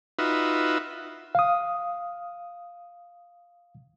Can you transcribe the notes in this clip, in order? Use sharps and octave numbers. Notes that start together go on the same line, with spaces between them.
D#4 F4 F#4 B4 E5
F5 D#6